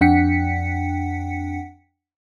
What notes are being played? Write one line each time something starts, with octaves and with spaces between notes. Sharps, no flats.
F2 D4 F#5 G5 B6 C#7